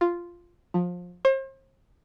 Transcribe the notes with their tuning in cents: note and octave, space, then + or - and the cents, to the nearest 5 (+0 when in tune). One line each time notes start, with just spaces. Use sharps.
F4 -5
F3 +25
C5 +40